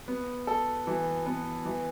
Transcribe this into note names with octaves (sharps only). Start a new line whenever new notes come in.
B3
A4
E3
B3
E3